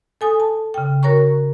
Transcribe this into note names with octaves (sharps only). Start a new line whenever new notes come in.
A4 G#5 D#6
A5
C#3 G5
F#4 A#4 C#5 A#5 C#6